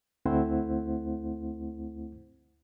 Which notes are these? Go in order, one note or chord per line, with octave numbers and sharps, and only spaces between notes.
D2 A3 C4 E4 C5 F#5